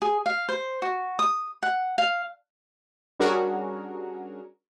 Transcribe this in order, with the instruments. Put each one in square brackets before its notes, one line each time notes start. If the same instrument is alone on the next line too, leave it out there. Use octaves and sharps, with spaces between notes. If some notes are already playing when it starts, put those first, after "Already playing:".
[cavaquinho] G#4
F5
C5
F#4
D#6
F#5
F5
[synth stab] G3 C#4 D4 F#4 G#4 A#4